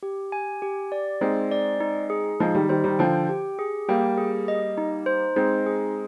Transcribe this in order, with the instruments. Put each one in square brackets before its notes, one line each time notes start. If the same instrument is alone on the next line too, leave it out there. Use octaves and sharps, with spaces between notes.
[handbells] G4
G#5
G4
D5
[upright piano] G#3 C4 [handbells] D#4
[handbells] D5
D#4
G#4
[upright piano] F3 G#3 [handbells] D#4
[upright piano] D#3 G3
[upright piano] D#3 G3 [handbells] C5
[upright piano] D#3 G3
[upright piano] D3 F3 [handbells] G5
[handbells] G4
G#4
[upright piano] G3 A#3 [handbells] G5
[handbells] G#4
D#5
D#4
C5
[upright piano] G#3 C4 [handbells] D#4
[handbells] G#4